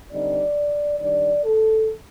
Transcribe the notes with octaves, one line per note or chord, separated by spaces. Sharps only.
D3 G3 C4 D#4 D5
D#3 G3 D4 D5
A4